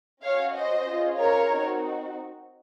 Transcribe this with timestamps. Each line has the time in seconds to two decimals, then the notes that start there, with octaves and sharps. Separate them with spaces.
0.23 C#4 F#4 C#5 F5
0.55 C5 D#5
0.86 C#4 F4 G#4
1.18 A#4 C#5
1.50 C4 D#4 F#4